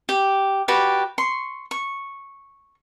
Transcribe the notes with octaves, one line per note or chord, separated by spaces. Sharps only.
G4
F#4 G4 B4 D5
C6 C#6
C#6